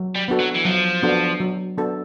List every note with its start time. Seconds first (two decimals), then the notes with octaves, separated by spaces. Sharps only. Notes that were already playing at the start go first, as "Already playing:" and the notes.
Already playing: F#3
0.15 G3
0.28 B3 D4 F#4 A4
0.40 F#3
0.56 E3
0.65 F3 F#3
1.03 B3 D4 F#4 A4
1.40 F#3
1.78 B3 D4 F#4 A4